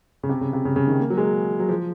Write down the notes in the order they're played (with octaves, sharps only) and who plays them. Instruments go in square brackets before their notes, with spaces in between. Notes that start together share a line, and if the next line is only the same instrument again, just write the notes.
[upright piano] C#3
C3
C#3
C3
C#3
C#3
D#3
A#3
F#3
G#3
F#3
F3